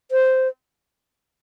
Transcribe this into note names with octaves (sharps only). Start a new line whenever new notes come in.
C5